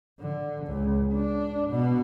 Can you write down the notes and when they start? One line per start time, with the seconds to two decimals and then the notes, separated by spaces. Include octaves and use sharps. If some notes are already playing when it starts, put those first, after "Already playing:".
0.20 D3
0.66 C#2
1.13 D4
1.70 B2